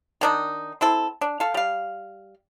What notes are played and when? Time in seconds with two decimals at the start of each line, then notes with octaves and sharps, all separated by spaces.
0.21 D#3 D4 D#4
0.81 C4 E4 A4
1.21 D4
1.40 A4 F5
1.54 G3 F5